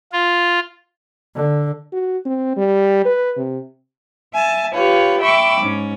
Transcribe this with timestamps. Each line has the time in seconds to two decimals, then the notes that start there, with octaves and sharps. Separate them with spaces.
0.13 F4
1.35 D3
1.93 F#4
2.25 C4
2.57 G3
3.05 B4
3.37 C3
4.33 E5 G#5 A5
4.75 F4 G4 B4 C#5 F5
5.21 E5 G5 B5 C#6 D6 E6
5.60 G#2 C#4